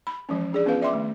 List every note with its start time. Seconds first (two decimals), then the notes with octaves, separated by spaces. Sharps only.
0.07 B5
0.29 E3 F3 G#3 C#4
0.53 D4 G#4 D5
0.66 B3 C#4 F4 G#4 B4 F5
0.82 D5 E5 G5 C6 D6
0.93 D#3 A3